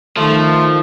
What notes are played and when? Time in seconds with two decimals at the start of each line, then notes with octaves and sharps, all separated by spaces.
0.17 D#3 F3 A3